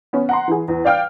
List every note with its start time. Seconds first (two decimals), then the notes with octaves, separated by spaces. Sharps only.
0.13 B3 C#4
0.29 F#5 A#5 C6
0.48 E3 G#4
0.68 E2
0.85 D5 F5 G5 F6